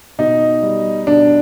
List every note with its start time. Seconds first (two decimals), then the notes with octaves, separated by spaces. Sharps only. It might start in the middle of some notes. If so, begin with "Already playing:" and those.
0.19 B2 D#4
0.62 G3
1.07 B2 D4